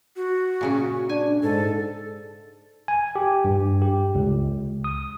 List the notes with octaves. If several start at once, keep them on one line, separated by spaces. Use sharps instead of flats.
F#4
A#2 C#3 C#4
D4 G#5
G#2 A4
G#5
G4
G2
G4
C#2
D#6